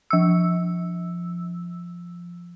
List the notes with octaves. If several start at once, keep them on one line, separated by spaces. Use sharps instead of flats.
F3 E6